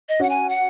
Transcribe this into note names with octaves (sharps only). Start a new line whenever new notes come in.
D#5
C#4 F#4 F#5
G#5
F#5